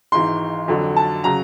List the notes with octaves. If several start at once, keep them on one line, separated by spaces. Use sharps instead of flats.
G#1 G#2 E3 C6
F2 D3 F#3
A5
C#3 F#3 A#5